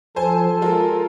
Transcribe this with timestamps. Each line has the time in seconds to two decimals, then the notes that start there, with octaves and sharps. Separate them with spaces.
0.16 F3 A4 C5 G#5
0.62 G#3 F4 A#4